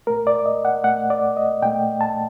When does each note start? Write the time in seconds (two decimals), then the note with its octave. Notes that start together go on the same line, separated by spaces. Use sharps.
0.07 A#2 A3 A#4
0.27 D5
0.46 D#5
0.65 F#5
0.84 A#2 A3 F#5
1.10 D5
1.37 D#5
1.62 A#2 A3 G5
2.01 A5